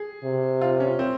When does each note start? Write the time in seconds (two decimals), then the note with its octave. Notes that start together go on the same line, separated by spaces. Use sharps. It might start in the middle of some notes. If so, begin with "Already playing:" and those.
Already playing: G#4
0.24 C3
0.61 F4
0.80 C#4
0.99 C4